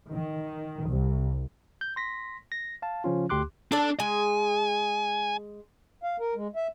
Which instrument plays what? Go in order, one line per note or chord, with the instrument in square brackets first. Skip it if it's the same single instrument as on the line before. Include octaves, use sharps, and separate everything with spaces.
[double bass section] D#3
C2
[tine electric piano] G6
C6 A#6 B6
A#6
F5 A5
C#3 F3 C#4 F4
D2 G4 C6 D6 F#6
[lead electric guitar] D4 [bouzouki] A4 D5
[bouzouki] G#3 [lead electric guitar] G#5
[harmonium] F5
A#4
G#3
E5